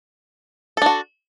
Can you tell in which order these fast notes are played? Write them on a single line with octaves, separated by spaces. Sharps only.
A4 D4 F#4